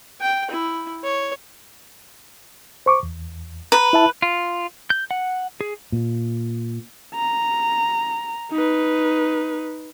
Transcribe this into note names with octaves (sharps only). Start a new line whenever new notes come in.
G5
E4
C#5
C5 C#6 D6
E2
B4 A#5
E4 E5 A5
F4
G6
F#5
G#4
A#2
A#5
D#4 B4